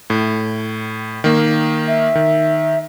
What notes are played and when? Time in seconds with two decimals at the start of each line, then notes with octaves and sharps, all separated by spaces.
0.10 A2
1.24 D#3 A#3
1.88 E5
2.15 D#3